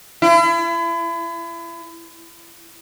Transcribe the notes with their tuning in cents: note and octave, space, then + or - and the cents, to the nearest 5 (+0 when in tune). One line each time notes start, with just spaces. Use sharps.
E4 +35